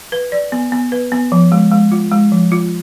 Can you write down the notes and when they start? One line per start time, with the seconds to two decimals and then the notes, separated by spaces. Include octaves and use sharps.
0.12 B4
0.32 D5
0.52 B3
0.72 B3
0.92 B4
1.12 B3
1.32 F3
1.52 G#3
1.72 G#3
1.92 F4
2.12 G#3
2.32 F3
2.52 F4